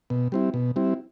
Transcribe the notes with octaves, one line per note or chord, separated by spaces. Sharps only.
B2
G3 C4 E4
B2
G3 C4 E4